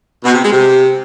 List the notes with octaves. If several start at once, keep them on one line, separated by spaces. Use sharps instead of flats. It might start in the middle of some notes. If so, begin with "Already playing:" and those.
B2
C3
G#3
C3